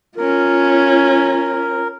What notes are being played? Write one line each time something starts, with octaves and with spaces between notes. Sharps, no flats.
C#4 F4 A#4